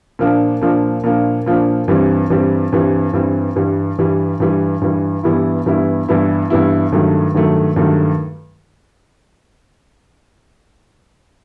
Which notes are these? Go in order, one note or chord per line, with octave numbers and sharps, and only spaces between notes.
A#2 F3 A#3 D4
A#2 F3 A#3 D4
A#2 F3 A#3 D4
A#2 F3 A#3 D4
G2 E3 G3 C4
G2 E3 G3 C4
G2 E3 G3 C4
G2 E3 G3 C4
G2 E3 G3
G2 E3 G3
G2 E3 G3
G2 E3 G3
G2 E3 G3 B3 E4
G2 E3 G3 B3 E4
G2 E3 G3 B3 E4
G2 E3 G3 B3 E4
G2 D#3 F#3 A3
G2 D#3 F#3 A3
G2 D#3 F#3 A3